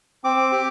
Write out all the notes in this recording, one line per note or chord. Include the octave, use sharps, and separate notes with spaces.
C4 D6
G4